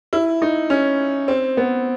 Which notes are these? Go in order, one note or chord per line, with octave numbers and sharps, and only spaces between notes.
E4
D#4
C#4
C4
B3